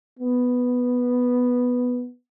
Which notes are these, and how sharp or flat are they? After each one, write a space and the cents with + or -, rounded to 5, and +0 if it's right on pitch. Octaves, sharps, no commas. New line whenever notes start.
B3 +0